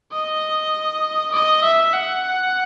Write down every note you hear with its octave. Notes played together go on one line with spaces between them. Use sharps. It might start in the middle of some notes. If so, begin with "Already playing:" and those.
D#5
D#5
E5
F#5